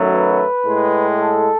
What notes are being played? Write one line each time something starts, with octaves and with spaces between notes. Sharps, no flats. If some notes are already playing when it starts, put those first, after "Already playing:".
Already playing: F#2 D#3 F#3 A3
B4
A2 G#3
A4